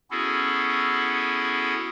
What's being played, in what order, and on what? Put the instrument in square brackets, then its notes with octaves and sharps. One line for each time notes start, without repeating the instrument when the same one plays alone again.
[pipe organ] B3 C#4 E4 F#4 G#4 A4